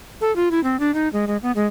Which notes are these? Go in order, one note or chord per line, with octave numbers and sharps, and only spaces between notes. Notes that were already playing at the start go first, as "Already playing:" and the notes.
A4
F4
E4
C4
D4
D#4
G#3
G#3
B3
G#3